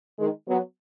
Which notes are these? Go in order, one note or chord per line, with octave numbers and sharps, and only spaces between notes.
D#3 G#3
F#3 B3